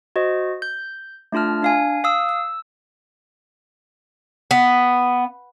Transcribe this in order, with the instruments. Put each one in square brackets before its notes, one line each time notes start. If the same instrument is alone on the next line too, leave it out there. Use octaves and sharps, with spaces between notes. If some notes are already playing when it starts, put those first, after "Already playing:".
[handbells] F#4 C5 D#5
G6
A3 D4 F4 A5 F6
D4 F5 G#5
F5 D#6 E6
E6
[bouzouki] B3